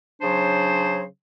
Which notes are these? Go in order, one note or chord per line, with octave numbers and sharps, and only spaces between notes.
C#3 F#3 D4 C5